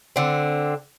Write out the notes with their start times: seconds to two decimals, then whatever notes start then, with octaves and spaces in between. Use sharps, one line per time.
0.16 D3 C4